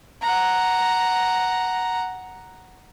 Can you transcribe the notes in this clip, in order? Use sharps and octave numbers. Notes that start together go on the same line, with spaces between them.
F#5 A#5